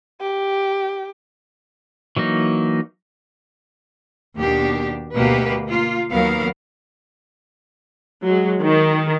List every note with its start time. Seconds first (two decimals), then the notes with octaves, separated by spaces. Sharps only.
0.21 G4
2.17 E3 F#3 A#3 D#4
4.38 D#2 B2 D4 G4
5.16 D2 B2 A#3 G4 B4
5.67 A#3 F4
6.12 D#2 F#3 B3 A#4 F5
8.24 F#3 G#3
8.61 D#3